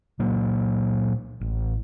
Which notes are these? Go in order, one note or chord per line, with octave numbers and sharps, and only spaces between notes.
A#2 F#3 A#3
A1